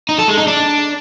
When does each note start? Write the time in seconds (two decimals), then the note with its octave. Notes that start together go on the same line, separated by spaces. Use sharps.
0.09 D#4
0.18 A4
0.28 G#3
0.38 D#4
0.47 D4